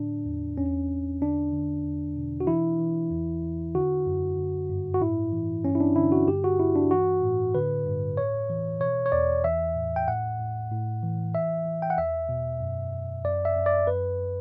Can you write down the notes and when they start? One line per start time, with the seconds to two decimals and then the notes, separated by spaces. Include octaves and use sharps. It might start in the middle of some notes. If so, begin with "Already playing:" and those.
Already playing: A2 D3 D4
0.26 E2
0.58 E2 C#4
0.89 E2
1.21 D3 D4
1.53 D3
1.84 E2
2.16 B2
2.40 F#4
2.47 E3 E4
2.79 E3
3.11 E2
3.43 E2
3.75 D3 F#4
4.06 F#2
4.38 D3
4.69 G2
4.94 F#4
5.01 A2 E4
5.32 E3
5.65 G2 C#4
5.75 E4
5.80 D4
5.95 D3 E4
6.12 F#4
6.28 G2 G4
6.44 F#4
6.59 G2 E4
6.76 D4
6.90 E3 F#4
7.22 A2
7.55 D3 B4
7.86 G2
8.17 A2 C#5
8.50 E3
8.80 B2 C#5
9.06 C#5
9.12 E2 D5
9.44 E3 E5
9.76 A2
9.96 G5
10.07 A2 F#5
10.39 A2
10.71 A2
11.03 E3
11.34 E3 E5
11.66 E3
11.82 G5
11.90 F#5
11.98 E2 E5
12.29 B2
12.60 F#2
12.92 F#2
13.24 F#2 D5
13.45 E5
13.56 F#2
13.66 D5
13.87 F#2 B4